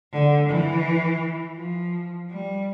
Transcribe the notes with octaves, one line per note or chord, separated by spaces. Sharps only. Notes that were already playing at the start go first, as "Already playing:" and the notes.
D3
E3
F3
G3